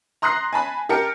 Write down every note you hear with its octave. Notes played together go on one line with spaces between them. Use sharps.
A#5 C6 D#6 F#6 A#6 C7
G#5 A5 B5
G4 A#4 A5 C#7